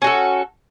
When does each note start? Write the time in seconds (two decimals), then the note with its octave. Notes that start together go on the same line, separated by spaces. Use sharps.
0.02 C#4
0.04 F#4
0.07 A4